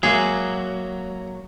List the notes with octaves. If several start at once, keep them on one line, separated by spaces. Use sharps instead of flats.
F#3 G#3 A#3 G#4 E5